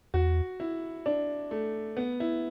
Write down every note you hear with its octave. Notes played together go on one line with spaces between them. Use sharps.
E2 F#4
E4
D4
A3
B3
E4